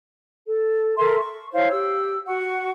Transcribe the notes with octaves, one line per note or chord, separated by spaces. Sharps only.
A4
A4 A#4 E5 C6
C#6
E4 C5 C#5 F5
G4 E6
F#4 F#5 C#6